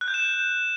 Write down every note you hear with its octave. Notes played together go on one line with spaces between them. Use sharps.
F#6
G6
E7